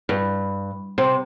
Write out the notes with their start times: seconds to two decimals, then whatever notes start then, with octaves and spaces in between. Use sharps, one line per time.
0.09 G2
0.98 C3